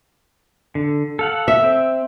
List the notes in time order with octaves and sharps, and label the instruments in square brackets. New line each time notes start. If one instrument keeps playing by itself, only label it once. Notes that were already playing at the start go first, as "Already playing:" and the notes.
[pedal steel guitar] D3
A4 F5 F#5
[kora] E5
[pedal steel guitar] C4